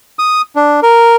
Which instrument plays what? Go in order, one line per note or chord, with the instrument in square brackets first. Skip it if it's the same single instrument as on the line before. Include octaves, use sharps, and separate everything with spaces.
[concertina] D#6
D4
A#4